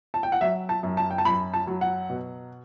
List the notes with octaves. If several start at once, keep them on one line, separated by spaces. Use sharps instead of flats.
A5
G5
F#5
F#3 E5
A5
F#2
A5
G5
A5
F#2 B5
A5
F#3
F#5
B2